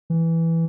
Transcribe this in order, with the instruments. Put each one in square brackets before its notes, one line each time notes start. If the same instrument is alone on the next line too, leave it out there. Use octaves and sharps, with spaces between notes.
[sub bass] E3